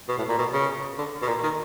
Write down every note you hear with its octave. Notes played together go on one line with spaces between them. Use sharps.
B2
A2
A#2
B2
C#3
D3
B2
A#2
D#3